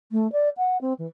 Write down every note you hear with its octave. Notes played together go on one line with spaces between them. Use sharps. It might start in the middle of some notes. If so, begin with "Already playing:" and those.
A3
D5
F#5
C4
E3